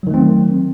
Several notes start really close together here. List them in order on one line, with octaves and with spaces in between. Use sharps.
F#3 D#3 A3 C4